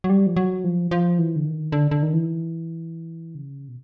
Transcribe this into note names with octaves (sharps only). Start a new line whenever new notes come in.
F#3
G3
F3
F#3
F3
F3
E3
D3
D#3
D3
D3
D#3
E3
C#3
B2